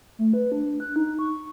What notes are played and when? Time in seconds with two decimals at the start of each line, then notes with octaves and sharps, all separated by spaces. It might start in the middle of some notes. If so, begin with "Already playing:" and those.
0.19 A3
0.33 B4
0.52 D4
0.80 F#6
0.96 D#4
1.19 C#6